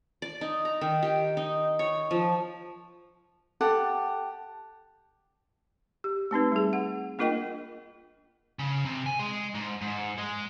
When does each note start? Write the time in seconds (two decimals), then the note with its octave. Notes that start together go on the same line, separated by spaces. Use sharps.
0.22 D5
0.41 D#4
0.65 A#5
0.81 D#3
1.03 G4
1.37 D#4
1.79 C#5
2.11 F3
3.61 G4 A4 F#5
6.04 G4
6.31 A3 C4 D#4 B4
6.52 G3 G#4
6.73 F#5
7.19 A#3 D4 F4 A#4 D#5 G5
8.59 C#3
8.85 C3
9.06 G#5
9.20 G#3
9.55 G#2
9.81 G#2
10.18 G#3